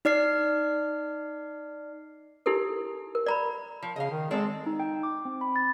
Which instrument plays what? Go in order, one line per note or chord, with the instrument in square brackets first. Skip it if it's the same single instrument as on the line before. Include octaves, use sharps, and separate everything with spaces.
[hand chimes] D#4 D5 F6 C7
[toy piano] D#4 E4 G4 A4 A#4
A#4
D5 A#5 B5
[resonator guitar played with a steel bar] F3
[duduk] C#3 [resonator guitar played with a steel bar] D#5 F5
[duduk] D#3
[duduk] G#3 [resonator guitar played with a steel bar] C4 A4 D5
[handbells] D#4
G5
D6
C4
B5
A6